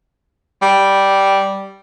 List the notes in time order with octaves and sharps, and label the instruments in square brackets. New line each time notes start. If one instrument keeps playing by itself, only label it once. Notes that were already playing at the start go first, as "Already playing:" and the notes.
[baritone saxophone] G3